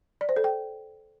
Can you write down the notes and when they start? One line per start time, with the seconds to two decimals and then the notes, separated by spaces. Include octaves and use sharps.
0.21 D5
0.29 C5
0.36 A4
0.44 G5